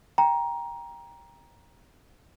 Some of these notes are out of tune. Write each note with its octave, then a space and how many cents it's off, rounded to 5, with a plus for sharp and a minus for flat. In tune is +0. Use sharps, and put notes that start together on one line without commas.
G5 +15 A#5 +15